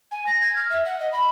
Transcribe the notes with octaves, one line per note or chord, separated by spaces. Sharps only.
G#5
A#6
G#6
F6
E5
F#5
D#5
B5